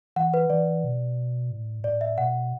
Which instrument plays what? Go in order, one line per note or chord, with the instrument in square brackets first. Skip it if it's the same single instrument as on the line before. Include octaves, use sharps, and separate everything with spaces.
[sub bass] E3 [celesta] F#5
[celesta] B4
[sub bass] E3 [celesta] D5
[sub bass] B2
A2
[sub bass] A2 [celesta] D5
[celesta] E5
[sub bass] B2 [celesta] F#5